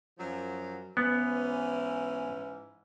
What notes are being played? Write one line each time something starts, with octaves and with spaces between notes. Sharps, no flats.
F#2 F3 F#3
G#2 E3 B3 C#4